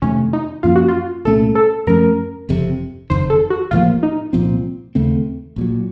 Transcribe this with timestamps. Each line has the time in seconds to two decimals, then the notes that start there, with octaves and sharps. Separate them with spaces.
0.02 F2 C3 D#3 A3 C#4
0.33 D#4
0.63 F#2 F3 A#3 C#4 F4
0.76 F#4
0.88 F4
1.25 C2 A#2 A3 C#4 A4
1.55 A4
1.87 F#2 F3 A3 C#4 A#4
2.49 F#1 F2 C3
3.10 F#1 F2 D#3 C5
3.30 A4
3.50 F#4
3.71 A1 A2 F3 A#3 F4
4.03 D#4
4.33 C2 A#2 F3 C4
4.95 D#2 C#3 A3 C4
5.56 A#1 A#2 F#3